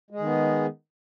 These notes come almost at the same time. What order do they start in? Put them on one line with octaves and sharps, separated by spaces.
G#3 G#4 D#3 B3